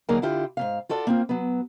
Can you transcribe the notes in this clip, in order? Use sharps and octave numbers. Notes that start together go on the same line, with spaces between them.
D3 F#3 A#3 D#4 G#4 A#4
D3 E4 F4 G4
G#2 C3 F5
F4 F#4 A4 D5
A#3 C4 F4
F#3 B3